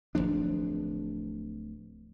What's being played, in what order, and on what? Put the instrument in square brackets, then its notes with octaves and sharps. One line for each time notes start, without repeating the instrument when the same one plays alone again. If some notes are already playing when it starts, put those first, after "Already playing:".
[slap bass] D1 C#2 F3 D4